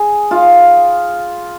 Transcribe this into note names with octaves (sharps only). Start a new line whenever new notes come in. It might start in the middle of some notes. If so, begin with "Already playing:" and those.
Already playing: G#4
F4